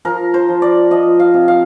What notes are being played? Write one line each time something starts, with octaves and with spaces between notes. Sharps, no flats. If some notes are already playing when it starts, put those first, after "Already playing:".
F3 A#4
C5
F3
D5
F3 D#5
F5
C3
F5